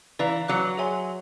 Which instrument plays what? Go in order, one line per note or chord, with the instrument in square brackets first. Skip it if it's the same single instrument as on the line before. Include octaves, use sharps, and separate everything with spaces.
[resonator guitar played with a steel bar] E3 [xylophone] B4 D5 F5 A#5
[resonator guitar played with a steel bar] F#3 [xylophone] C#5 F#5 A#5 D6 F#6
[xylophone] G#4 C#5 E5 G#5 C6